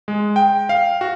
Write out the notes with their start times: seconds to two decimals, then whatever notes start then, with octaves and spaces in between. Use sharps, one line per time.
0.08 G#3
0.36 G5
0.69 F5
1.01 F#4